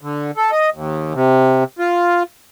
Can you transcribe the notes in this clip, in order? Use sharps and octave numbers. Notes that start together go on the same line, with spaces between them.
D3
A4
D#5
D#2
C3
F4